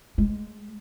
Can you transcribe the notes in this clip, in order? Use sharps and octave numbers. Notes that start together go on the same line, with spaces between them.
G#3